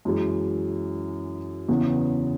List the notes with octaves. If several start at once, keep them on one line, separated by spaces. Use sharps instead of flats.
F#2 E3 G#3
E2 C#3 E3 B3